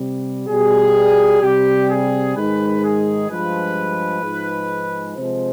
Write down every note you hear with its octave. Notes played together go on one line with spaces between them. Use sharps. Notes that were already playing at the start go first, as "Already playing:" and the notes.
Already playing: C3 G3
B2 G3 G#4
C3 G3 G4
G#4
G#2 D#3 G#3 B4
G#4
G2 F3 G#3 B4
G#2 F3 G#3
C3 F3 G#3 C5